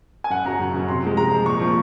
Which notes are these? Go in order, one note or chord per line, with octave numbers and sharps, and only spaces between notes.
G#5
F#2 F#5
C#3 F#3 A#5
F#2
C#3 F#3
C3 C6
F3 G#3
C3 A#5
F3 G#3
A#2 C#6
F3 A#3